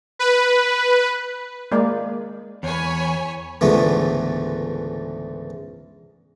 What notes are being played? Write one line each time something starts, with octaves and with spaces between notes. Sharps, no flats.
B4
G#3 A#3 D5
E2 C#5 G#5 B5
C#2 G#2 D3 E3 A3 B3